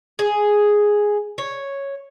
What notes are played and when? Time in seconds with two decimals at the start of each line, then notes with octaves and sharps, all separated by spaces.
0.19 G#4
1.38 C#5